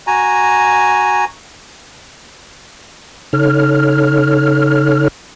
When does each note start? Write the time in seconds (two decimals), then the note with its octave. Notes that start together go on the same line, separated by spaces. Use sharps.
0.07 F#4 G#5 A#5
3.33 C#3 D#4 A4 C#5 F6